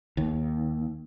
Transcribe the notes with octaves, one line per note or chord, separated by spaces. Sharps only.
D#2